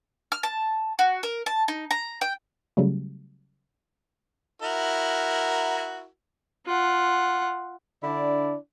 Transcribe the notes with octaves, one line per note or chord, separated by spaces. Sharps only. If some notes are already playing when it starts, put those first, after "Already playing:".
F6
A5
F#4
A#4
A5
D#4
A#5
G5
C#3 F#3 G3 A3
E4 F#4 A#4
F4 F#5
D3 D4 E4 D5